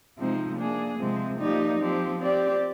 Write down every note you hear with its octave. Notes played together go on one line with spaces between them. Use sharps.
C3 F3 G#3 C4 D#4
A#3 D4 G#4
C3 F3 G#3 C4
F3 A#3 D#4 G4 D5
F3 C4 G4
C4 G4 D5